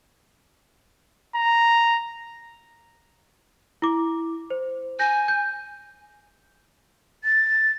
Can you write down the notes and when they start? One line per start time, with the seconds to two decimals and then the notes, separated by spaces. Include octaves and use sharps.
1.35 A#5
3.82 E4 D6
4.50 C5
4.99 G#5 G6 A#6
5.28 G6
7.24 A6